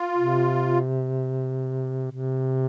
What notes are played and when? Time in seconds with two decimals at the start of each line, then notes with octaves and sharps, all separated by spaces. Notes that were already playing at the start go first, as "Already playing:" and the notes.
Already playing: F4
0.18 C3
2.12 C3